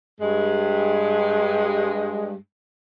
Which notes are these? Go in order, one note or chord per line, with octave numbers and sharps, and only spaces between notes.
G2 G#3